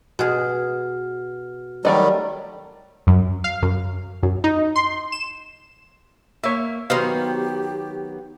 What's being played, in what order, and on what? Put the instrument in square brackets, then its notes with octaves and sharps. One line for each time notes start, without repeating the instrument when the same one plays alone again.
[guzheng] B2 G#4 [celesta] F#4 F6
[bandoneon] D#3 F#3 G3 [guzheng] A3 [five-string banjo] A#4 D5 D#5
[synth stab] F#2
F5
F#2
F#2
D#4
C6
E7
[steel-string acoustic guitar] A#3 [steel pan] C#5 E5
[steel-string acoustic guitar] D#3 F#3 B3 [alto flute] G4 [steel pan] C5 D#5 F5